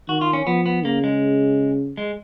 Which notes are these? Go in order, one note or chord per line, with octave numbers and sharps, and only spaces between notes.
D#3 F#4
F4
C#4
F3 B3
B3
C#3 A#3
G#3
G#3